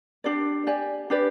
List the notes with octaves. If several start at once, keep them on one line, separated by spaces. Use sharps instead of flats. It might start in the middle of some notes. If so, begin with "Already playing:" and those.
D4 G4 D5
G4 D5 G#5
D4 G4 B4 D5